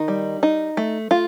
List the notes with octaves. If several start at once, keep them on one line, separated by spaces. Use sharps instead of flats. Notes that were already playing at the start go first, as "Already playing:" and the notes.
Already playing: D#3 D#4
G3
D#4
A3
A3 F4